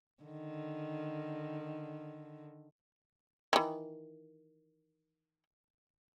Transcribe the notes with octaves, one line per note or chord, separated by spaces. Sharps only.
D3 D#3
D#3 E3